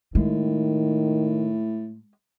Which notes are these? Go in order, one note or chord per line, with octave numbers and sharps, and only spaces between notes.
A2 D#3 G#3